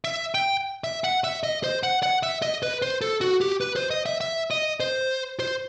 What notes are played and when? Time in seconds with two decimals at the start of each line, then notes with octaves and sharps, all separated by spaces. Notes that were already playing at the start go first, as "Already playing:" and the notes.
0.04 E5
0.35 G5
0.84 E5
1.04 F#5
1.24 E5
1.43 D#5
1.64 C5
1.83 F#5
2.03 F#5
2.23 E5
2.42 D#5
2.63 B4
2.82 C5
3.01 A4
3.21 F#4
3.41 G4
3.61 B4
3.76 C5
3.91 D#5
4.06 E5
4.21 E5
4.51 D#5
4.80 C5
5.40 C5